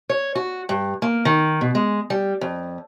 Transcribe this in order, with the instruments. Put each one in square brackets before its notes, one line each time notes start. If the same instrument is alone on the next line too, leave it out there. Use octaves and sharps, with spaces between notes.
[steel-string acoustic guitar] C#5
F#4
G2
A#3
D#3
B2
G#3
G3
F2